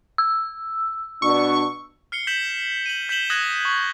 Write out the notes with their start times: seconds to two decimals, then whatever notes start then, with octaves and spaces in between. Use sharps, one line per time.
0.18 E6
1.22 B2 D4 C#6
2.12 F6 C7 C#7 G7
2.27 G6 B6 E7 F#7
2.86 D#7 F#7
3.09 G6 B6 E7 F#7 G7
3.30 D#6 F#6 G#6 A#6 F#7
3.65 C#6